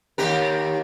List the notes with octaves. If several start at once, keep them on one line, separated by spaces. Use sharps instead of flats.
D#2 G4 A#4